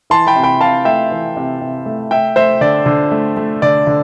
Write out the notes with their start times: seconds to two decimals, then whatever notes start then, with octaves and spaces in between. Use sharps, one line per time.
0.10 E3 A5 C6
0.27 G5 B5
0.36 C3
0.44 G5 B5
0.61 C3 F5 A5
0.85 A3 E5 G5
1.11 E3
1.37 C3
1.61 C3
1.86 A3
2.11 A3 E5 G5
2.36 A3 C5 E5
2.61 D3 D5
2.86 D3
3.12 A3
3.37 A3
3.62 D3 D5
3.87 D3